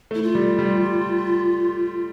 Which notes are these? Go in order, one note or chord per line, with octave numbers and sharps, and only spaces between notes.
A3 E4
F4
G3
G3